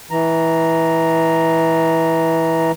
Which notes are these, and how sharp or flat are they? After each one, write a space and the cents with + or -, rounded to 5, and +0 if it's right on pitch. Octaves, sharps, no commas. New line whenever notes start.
E3 -15 A#5 +0